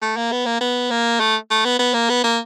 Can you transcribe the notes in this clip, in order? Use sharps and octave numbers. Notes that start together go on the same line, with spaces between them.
A3
A#3
B3
A#3
B3
A#3
A3
A3
B3
B3
A#3
B3
A#3